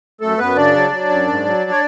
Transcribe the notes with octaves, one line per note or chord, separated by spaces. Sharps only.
F#2 A3 A4
F#2 B3 B4
C#3 D4 D5
F#3
F#3
F#2
G#2
F#3
C#5